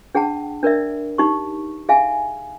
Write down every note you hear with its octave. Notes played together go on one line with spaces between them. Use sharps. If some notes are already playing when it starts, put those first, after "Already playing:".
D4 G#4 F#5 G5 A5
D4 A#4 D5 E5
D#4 G4 C#6
G#4 E5 F5 G#5